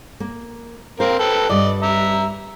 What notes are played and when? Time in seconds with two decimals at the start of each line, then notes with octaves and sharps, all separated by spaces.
0.20 A#3
1.00 C4 A#4 C5 F5
1.19 A4 B4 G5
1.49 G2 G3 D5 D#5
1.82 E5 A#5